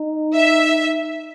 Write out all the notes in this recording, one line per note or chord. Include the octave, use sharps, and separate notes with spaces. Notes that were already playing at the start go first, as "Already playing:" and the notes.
Already playing: D#4
E5